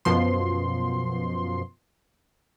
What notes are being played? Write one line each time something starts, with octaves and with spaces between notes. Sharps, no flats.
F#2 B2 F3 C6